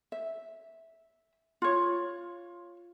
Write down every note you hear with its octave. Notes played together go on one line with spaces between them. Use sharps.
E5
F4 C#5